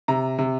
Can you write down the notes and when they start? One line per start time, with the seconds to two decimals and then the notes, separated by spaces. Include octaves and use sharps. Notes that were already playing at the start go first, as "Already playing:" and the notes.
0.08 C3 A#5
0.38 C3